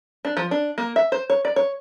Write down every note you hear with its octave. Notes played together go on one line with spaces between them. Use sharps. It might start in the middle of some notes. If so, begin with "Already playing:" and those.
D4
F3
D4
A#3
E5
C5
C#5
D5
C#5